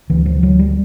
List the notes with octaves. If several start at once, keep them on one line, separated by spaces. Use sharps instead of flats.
D2 E3
F3
D2 F#3
G3